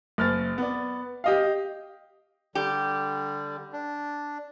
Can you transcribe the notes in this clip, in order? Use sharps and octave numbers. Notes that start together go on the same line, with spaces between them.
F#1 F6 A6
B3 D5
G4 D#5 F5
D3 G3 G4
D4